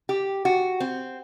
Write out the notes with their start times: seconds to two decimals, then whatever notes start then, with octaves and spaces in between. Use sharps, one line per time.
0.09 G4
0.45 F#4
0.80 C4